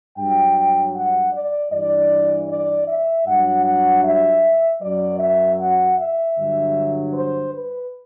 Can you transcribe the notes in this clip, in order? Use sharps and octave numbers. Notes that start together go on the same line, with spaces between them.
G2 F#3 G5
F#5
D5
G2 E3 D5
D5
E5
G2 F#3 F#5
F#5
E5
F#2 F#3 D5
E5
F#5
E5
G2 D3 F#3
C5
B4